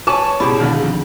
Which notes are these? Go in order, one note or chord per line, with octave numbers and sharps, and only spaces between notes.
F#4 B4 C#5 G#5 A5 C#6
C#2 G#2 B2 E4 G4 G#4 C5 D5
B2 D3 D#3 F5 A5
F2